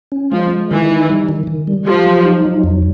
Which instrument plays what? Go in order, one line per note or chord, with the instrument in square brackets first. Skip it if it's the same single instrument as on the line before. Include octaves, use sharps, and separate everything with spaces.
[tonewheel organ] C#4
[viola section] F3 [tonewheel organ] G#3
[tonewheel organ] G#3
[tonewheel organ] D#3 [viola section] E3
[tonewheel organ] D#4
G3
D#3
D#3
G3
[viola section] F3 [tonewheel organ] G4
[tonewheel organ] F#3
D#4
F#3
F2